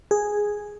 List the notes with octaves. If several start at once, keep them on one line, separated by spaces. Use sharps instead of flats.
G#4